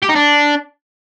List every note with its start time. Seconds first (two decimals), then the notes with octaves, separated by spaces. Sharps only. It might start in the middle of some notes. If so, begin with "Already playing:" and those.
0.02 G4
0.09 D#4
0.15 D4